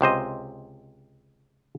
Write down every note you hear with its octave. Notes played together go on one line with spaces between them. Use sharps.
C#2 C3 C5 D#5